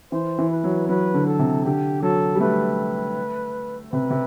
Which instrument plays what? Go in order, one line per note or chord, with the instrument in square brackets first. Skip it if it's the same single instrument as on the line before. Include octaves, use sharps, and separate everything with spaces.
[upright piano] E3 [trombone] C5
[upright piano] E3
[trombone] B4
[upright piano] F#3
[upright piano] F#3 [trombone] B4
[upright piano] D3
[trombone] A4
[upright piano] C3
[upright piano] D3 [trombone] G4
[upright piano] F#3 [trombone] A4
[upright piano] G3
[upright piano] A3 [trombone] B4
[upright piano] C3 [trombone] B4
[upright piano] C3